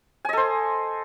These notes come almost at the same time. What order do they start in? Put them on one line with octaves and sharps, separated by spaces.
G#5 D#5 A4 C5